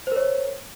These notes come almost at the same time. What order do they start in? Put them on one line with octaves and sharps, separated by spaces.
C5 A#4 C#5